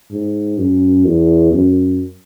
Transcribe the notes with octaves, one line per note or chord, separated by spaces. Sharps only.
G#2
F#2
E2
F#2